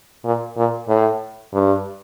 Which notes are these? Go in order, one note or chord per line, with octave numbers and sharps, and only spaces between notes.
A#2
A#2
A2
G2